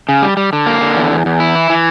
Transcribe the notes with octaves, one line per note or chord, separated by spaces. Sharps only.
C#3
G3
G3
D3
A#3
D3
E2
E2
E2
E4
E3
E3